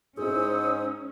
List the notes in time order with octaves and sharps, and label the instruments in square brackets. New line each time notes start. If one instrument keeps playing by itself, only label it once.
[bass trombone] G#2 [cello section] C#4 [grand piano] E4 G#4 [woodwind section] C5 D#6 E6